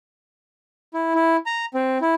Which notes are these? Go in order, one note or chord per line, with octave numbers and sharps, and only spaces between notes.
E4
E4
A#5
C4
E4